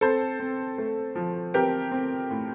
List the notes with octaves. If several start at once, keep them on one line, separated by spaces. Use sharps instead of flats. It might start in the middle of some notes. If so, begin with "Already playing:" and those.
C4 A4 C5
C4
A3
F3
C4 G4 A#4
C4
A2